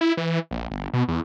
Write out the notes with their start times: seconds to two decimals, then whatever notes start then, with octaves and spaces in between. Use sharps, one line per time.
0.01 E4
0.17 E3
0.51 A#1
0.71 G1
0.93 B2
1.08 E2